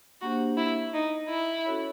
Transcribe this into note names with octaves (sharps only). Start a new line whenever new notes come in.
A#3 D4 F#4 G4 C5
E4
D#4
E4
C#4 F#4 A4 C#5